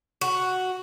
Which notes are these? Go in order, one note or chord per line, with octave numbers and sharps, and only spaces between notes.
F#4